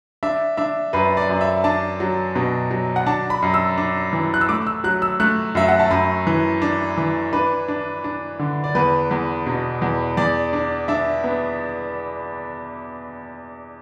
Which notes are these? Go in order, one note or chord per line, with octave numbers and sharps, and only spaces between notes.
D4 E5
D4 E5
F#2 B4
D5
F#2
E5
D4 A5
F#3
B2
F#3
F#5
D4 A5
B5
F#2
E6
D4
E3
F#6
E6
A3 D6
E6
F#3 F#6
E6
A3 F#6
F#2 E5
F#5
A5
F#2 B5
E3
D4
E3
D4 B4
D4
D4
D3
D5
E2 B4
E2
B2
E2
E2 D5
D4
D4 E5
B3